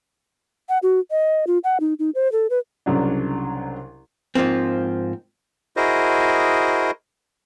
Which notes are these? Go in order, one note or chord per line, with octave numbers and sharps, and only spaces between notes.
F#5
F#4
D#5
F4
F#5
D#4
D#4
C5
A4
B4
C2 C#3 F#3 D4
G#2 F3 A#3 C4
E4 F#4 G#4 A#4 C5 D#5